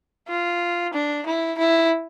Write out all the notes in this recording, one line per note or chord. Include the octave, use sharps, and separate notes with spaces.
F4
D4
E4
E4